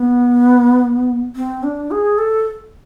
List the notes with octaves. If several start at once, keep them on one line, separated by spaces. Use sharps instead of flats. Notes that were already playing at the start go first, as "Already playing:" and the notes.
Already playing: B3
C4
D4
G#4
A4